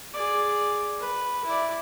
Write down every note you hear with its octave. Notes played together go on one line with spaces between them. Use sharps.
G#4 D5
B4
E4 D5